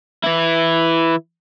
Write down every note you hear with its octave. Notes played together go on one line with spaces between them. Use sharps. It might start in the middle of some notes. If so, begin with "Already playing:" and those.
E3 E4